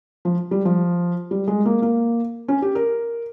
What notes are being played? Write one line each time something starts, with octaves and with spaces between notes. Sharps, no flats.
F3
G3
F3
G3
G#3
A#3
A#3
C#4
G4
A#4